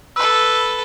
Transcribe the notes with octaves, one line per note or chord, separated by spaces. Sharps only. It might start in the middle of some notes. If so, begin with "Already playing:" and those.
A4 B4 B5 E6